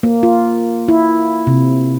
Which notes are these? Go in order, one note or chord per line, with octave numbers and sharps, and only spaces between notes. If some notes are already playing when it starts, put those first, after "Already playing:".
A#3
F4
E4
C3